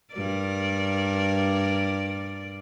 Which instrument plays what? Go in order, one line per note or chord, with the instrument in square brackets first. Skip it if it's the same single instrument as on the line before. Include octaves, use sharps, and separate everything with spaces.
[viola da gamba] G2 A#4 D5